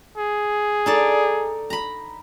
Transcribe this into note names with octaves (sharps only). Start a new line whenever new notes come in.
G#4
D#4 A4 D5
A#5 B5